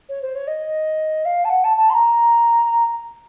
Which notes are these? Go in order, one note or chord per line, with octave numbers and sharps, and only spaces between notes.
C#5
C5
C#5
D#5
F5
A5
F#5
A5
A5
C6
A#5